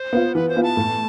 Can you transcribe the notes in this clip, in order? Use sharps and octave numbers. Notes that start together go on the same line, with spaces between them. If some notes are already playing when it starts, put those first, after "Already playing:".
Already playing: C5
B3 F4
E3 B4
C5
B3 F4
A5
A2